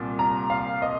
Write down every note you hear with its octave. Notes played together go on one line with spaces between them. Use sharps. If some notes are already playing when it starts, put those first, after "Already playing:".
Already playing: C2 A#2
A#5
F5
D#5